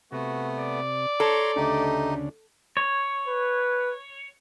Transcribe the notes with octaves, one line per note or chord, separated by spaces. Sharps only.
C3 A3 B3 F#4
D5
A4 C#5 A#5 C6
D2 C#3 A3 D4 D#4 G4
C#5
B4